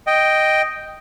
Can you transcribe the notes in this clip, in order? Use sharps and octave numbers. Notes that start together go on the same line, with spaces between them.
D#5 G5